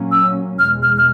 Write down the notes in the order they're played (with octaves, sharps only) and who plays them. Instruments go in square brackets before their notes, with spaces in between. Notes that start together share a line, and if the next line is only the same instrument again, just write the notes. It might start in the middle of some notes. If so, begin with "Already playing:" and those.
Already playing: [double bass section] A#2 F#3 A#3 C#4
[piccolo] E6
[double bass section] E2 B2 G#3 [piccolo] F6
[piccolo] F6
F6